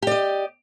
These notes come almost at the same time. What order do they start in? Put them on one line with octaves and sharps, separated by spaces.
G4 D5 D#5